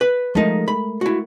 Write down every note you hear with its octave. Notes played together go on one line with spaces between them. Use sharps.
B4
F3 G#3 A3 D#4 A#4
B5
E4 F#4